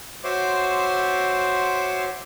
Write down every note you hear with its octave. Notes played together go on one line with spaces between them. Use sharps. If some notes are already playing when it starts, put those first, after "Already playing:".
F#4 C5 C#5 E5 C6 D6